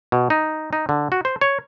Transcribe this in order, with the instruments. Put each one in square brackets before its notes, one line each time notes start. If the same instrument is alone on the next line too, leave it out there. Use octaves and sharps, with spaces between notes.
[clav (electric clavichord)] B2
D#4
D#4
D3
F#4
C5
C#5